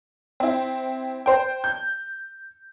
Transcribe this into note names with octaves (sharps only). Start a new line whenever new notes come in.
C4 E4
C5 G5
G6